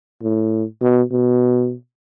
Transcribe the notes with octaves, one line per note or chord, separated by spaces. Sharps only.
A2
B2
B2